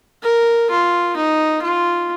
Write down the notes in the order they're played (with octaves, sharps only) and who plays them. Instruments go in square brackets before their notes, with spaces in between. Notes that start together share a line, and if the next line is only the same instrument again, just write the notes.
[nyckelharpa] A#4
F4
D#4
F4